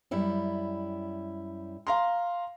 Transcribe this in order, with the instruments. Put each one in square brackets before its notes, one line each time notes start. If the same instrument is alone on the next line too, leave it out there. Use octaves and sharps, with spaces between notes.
[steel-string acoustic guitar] F#2 G3 E4
[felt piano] F5 A#5 C6